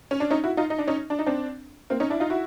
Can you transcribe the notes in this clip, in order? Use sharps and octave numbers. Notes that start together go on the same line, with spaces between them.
C#4
D4
C#4 D#4
E4 F#4
D#4 F4
D#4
D4
C#4 D#4
D4
D#4
C4 D4
A#3 C4
C#4 D#4
D4 E4
D#4 F4
E4 F#4